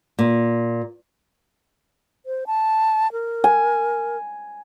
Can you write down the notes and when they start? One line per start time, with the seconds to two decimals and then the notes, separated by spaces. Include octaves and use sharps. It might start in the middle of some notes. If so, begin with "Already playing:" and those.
0.19 A#2
2.26 C5
2.47 A5
3.12 A#4
3.44 G#5